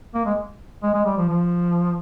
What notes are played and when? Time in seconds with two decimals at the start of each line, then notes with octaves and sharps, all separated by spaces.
0.14 A#3
0.25 G#3
0.83 G#3
0.94 G#3
1.05 G3
1.17 F3
1.29 F3